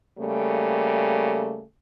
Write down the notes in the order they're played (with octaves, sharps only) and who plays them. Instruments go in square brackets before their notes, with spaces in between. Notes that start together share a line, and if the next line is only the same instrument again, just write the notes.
[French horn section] C#3 G3 A3 A#3